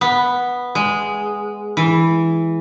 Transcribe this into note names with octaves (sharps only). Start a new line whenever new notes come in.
B3
G#3
E3